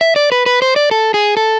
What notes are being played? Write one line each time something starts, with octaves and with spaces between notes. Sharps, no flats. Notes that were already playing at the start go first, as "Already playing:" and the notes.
E5
D5
B4
B4
C5
D5
A4
G#4
A4